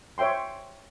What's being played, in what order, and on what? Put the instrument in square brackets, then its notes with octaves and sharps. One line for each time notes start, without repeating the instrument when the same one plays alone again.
[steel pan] C5 C#5 E5 G5 C6